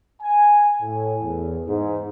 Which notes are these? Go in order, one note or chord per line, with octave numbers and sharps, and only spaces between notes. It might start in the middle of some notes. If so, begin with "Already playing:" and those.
G#5
A2
E2
G#2